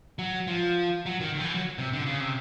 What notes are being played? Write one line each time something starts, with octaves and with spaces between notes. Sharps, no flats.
F#3
F3
F#3
D#3
D3
F3
E3
F#3
C3
D3
C#3
C3